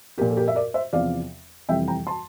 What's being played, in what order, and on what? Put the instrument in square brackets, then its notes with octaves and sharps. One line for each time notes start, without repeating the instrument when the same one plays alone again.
[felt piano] A#2 F3 G4 A#4
A4
G4 A#4
E5
A#4 D5
C5 E5
E2 C3 F3 D5 F5
F2 C3 E3 G3 E5 G5
G5 A#5
A5 C6